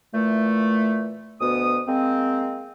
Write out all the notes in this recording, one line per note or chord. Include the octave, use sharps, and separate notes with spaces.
A#2 E3 A3
D2 B2 B3 D#6
G#3 A#3 C4